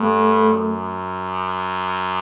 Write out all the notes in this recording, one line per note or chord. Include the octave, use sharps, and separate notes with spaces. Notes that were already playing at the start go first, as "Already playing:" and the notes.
Already playing: G2 A3
F#2